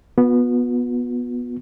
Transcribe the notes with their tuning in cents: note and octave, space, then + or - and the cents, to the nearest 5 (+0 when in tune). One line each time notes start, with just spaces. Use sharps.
B3 -10 F#4 -45